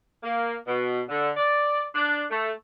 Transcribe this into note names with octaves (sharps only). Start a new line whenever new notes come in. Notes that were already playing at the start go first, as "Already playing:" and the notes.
A#3
B2
D3
D5
D4
A3